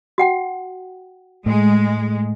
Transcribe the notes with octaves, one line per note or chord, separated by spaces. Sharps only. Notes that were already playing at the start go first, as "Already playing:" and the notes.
F#4 F#5 G5
A2 G#3